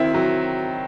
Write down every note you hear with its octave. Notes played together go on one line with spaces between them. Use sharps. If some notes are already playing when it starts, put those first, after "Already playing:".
Already playing: D#3 C4 E4
F#3